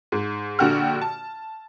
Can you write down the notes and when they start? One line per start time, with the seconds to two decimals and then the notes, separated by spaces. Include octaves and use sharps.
0.12 G#2
0.59 A#1 D3 F#4 G4 F6
1.02 A5